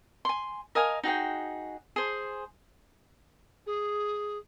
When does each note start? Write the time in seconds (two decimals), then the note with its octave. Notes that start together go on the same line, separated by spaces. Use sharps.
0.25 G#5 C6
0.75 A#4 D#5 F5 G#5
1.03 D#4 F#4 G#4 G5
1.96 G#4 C5
3.67 G#4